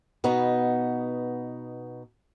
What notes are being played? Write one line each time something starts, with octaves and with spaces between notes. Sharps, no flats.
B2 B3 D#4